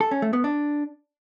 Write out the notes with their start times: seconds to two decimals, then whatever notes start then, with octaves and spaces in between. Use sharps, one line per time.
0.01 A4
0.11 C#4
0.22 A3
0.33 B3
0.44 D4